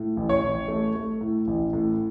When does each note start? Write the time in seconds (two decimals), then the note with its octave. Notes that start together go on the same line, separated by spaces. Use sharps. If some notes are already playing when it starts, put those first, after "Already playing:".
Already playing: A2
0.17 A1
0.29 C#5
0.42 A1
0.68 A3
0.95 A3
1.21 A2
1.47 A1
1.73 A2